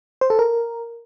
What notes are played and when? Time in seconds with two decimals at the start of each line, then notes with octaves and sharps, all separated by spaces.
0.21 C5
0.30 A4
0.39 A#4